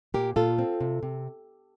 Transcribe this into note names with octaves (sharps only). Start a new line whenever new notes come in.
A#2 G4 A#4
A#2 F4 A4
C4
C3
C3